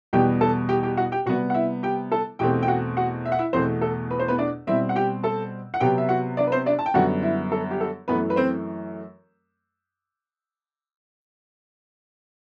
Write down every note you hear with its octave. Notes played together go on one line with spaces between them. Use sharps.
E2 B2 G3 B3 G4 G5
A4 A5
G4 G5
G4 G5
F#4 F#5
G4 G5
C3 G3 B3 F#4 F#5
F#5
E4 E5
G4 G5
A4 A5
E2 B2 A3 C4 G4 G5
G5
F#4 F#5
F#4 F#5
E5
F#5
E4 E5
E2 B2 A3 C4 C5
A4
B4
C5
B3 B4
D4 D5
B2 G3 C4 E4 E5
F#5
G4 G5
A4 A5
F#5
C3 F#3 B3 G4 G5
E5
F#4 F#5
D4 D5
B4
C4 C5
D4 D5
A5
G5
F#2 D3 G3 B3 F#4 F#5
E4 E5
A4
G4
A4
F#2 E3 A3 B3 B4
B4
C4 C5